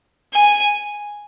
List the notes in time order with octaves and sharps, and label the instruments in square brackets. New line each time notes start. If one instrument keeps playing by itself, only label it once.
[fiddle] G#5